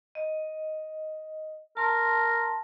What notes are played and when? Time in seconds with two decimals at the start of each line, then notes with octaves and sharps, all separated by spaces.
0.15 D#5
1.77 A#4 A5 C6